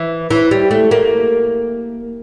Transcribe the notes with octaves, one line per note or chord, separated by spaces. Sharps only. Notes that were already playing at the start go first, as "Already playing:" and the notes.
Already playing: E3
E3
G3
A3
A#3